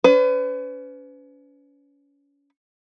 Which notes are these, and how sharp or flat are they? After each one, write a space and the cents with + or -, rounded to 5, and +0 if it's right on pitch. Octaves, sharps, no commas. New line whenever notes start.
C#4 +35 B4 +35